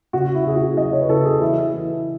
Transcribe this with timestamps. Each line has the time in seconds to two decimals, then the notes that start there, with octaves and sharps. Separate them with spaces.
0.13 C#3 F#4
0.35 E4
0.46 C#3 G#4
0.56 F#4
0.77 F#3 D#5
0.93 C#5
1.01 B4
1.09 C#3 A4
1.25 G#4
1.41 E3 E4
1.73 E3